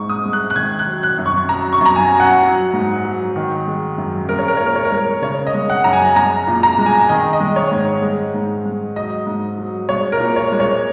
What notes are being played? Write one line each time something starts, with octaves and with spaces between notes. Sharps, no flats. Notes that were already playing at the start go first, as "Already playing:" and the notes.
Already playing: G#2 G#3 C#6
D#6
G#3
F#6
F#6
D#3 G#6
F#6
F#3
F#6
F#2
C#6
F#3 A#5
C#6
F#2 A#5
G#5
F#3
F#5
F#3
G#2
F#3
D#3
G#3
F#2
G#3 A#4
C#5
A#4
A#2 C#5
A#4
C#5
A#4
G#3
C#3 C#5
D#5
G#3
F#5
F#2 A#5
G#5
G#3 A#5
A#2
A#5
G#3
G#5
D#3 D#5
D#5
G#3
C#5
G#2
G#3
G#2
G#3
F#3 D#5
G#2
F#3
G#3 C#5
A#4
A#2
C#5
G#3
C#5